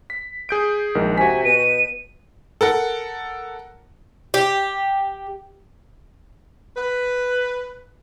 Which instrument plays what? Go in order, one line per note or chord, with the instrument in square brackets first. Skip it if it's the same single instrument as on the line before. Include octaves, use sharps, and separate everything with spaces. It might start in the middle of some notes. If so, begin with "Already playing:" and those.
[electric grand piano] B6
G#4 G6 D7
[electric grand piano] A#1 G#3 D#4 [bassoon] D#3
[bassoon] C3 [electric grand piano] F#4 B6 [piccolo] G#5
[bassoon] B2 [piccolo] D#7
[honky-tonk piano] A4 A#4 F#5
[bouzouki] G4
[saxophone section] B4